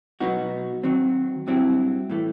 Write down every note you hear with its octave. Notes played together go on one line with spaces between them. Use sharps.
B2 F#3 B3 D#4 F#4
D#3 F#3 C4
G2 F#3 C4 E4 G4
A2 E3 A3